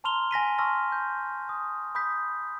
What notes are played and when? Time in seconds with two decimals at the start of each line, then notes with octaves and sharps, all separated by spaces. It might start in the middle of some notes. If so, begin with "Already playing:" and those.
0.04 A5 A#5 C6 F6 F7 G7
0.31 G#5 A#6 B6 D#7
0.58 A5 C6 C#6 E6 F6 A#6
0.92 G6
1.49 D#6
1.95 B5 D#6 G6 B6